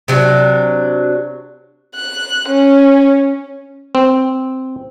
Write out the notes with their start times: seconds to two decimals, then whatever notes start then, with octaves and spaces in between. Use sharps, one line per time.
0.08 C3 F#3 D4
1.95 F#6
2.49 C#4
3.95 C4